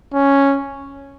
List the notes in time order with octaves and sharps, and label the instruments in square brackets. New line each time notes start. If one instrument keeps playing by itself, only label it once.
[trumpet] C#4